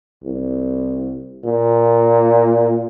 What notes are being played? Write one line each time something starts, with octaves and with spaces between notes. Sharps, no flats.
C2
A#2